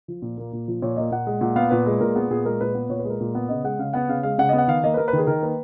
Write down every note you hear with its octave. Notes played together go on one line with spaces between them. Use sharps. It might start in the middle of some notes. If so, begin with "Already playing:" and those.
F3
A#2
A#3
A#2
F3
A#2 C#5
A#3 D#5
A#2 F#5
G#3
A#2 F#5
B3 F5
A#2 B4
G#3
A#2 A#4
B3 G#4
A#2 G#4
G#3 A#4
A#2 B4
B3
A#2 C#5
B4
G#3
A#4
A#2
B3
C#3 D#5
G#3 F#5
C#3 F5
B3 F#5
C#3 F5
G#3 F5
C#3 F#5
B3 D#5
F#5
D#3 F5
A#3 D#5
B4
A#3 A#4
B4
D#3
G#4
D#3 A#4
A#3 B4